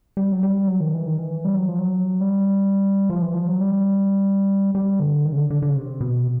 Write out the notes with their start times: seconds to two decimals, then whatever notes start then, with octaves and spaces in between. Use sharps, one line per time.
0.17 G3
0.32 F#3
0.43 G3
0.68 F#3
0.80 D#3
0.94 E3
1.06 D#3
1.18 E3
1.45 G3
1.56 F#3
1.68 F3
1.79 F#3
2.21 G3
3.10 F3
3.22 E3
3.34 F3
3.47 F#3
3.60 G3
4.75 G3
5.00 D3
5.25 D#3
5.32 C#3
5.37 D3
5.50 D3
5.62 D3
5.69 C#3
5.76 C3
6.01 B2